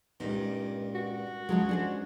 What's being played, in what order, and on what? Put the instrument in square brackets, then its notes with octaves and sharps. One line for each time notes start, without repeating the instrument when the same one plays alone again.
[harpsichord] C#2 G2 A#2 [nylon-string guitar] D#4
[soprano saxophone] F#4
[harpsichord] C#2 [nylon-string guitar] F3 F#3 G#3
[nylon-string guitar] D4 G#4 C5